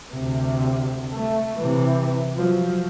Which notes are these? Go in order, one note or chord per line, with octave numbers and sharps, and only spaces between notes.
D2 C3
A3
C3 E3
F3 F#3